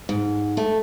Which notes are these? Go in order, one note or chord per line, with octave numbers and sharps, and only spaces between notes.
G#2
A3